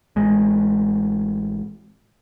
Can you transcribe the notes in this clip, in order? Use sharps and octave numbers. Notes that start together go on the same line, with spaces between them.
A1 G#3